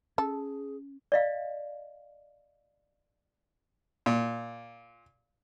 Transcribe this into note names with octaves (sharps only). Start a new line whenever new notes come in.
C#4 G#4 A4
D5 D#5 F5
A#2